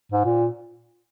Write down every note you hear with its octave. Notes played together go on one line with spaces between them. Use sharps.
G#2
A#2